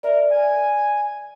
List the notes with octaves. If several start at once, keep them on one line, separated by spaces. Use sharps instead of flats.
A#4 D5 E5
G#5